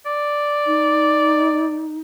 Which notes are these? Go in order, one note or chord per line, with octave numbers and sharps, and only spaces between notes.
D5
D#4